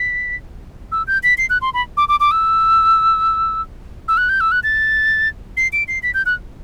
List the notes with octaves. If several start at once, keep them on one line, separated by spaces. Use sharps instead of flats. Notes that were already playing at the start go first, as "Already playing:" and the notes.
Already playing: B6
E6
G6
B6
C7
F#6
C6
B5
D6
D6
D6
E6
E6
F#6
G6
E6
F#6
A6
C7
D7
C7
B6
G6
F#6